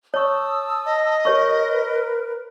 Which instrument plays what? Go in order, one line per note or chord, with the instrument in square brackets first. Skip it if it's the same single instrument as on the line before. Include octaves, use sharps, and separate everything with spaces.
[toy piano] C#5 C#6 [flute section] A5 D#6 E6
[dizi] D#5
[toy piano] G4 C#5 C#6 [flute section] A#4 B4